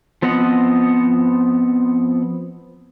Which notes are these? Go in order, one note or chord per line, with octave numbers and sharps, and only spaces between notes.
F3 B3 C4 D#5 F#5